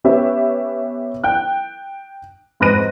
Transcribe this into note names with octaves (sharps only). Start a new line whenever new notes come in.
B3 C#4 G4 B4 C#5 E5
G5 F#6
F2 G#2 B4 F#6 A#6 D#7